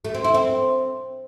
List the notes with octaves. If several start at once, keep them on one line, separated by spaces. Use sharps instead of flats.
A3
C4
E4
C4